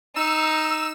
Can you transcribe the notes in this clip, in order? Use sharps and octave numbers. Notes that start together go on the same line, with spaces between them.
D#4 E6 E7